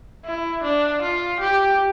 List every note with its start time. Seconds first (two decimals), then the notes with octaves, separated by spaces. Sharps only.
0.25 E4
0.63 D4
1.02 F4
1.39 G4